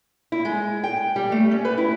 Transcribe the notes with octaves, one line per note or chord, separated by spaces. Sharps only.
E4
G#3
G5
G3
A3
C#4
B4
E4